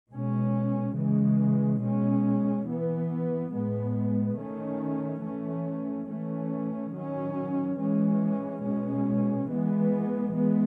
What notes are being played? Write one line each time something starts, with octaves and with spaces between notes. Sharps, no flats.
B2 G#3 C#4
C#3 E3 G#3
B2 G#3 C#4
E3 B3
A2 G#3 B3
D#3 A3 C#4
E3 A3 C#4
E3 A3 C#4
D#3 F#3 C#4
E3 G#3 C#4
B2 G#3 C#4
E3 G#3 B3
E3 G#3 B3